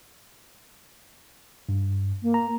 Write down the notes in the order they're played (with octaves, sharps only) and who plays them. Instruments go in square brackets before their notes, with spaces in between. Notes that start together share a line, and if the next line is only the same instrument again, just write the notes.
[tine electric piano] G2
[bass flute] A#3
[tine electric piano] A#5